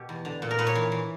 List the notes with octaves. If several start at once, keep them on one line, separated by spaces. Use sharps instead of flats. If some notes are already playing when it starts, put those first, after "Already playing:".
Already playing: B2 G4
E2
D3
A#2
A#4
A#2 B4
C#5
E3
E3